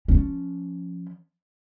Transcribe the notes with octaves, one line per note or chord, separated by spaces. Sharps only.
F3 C#4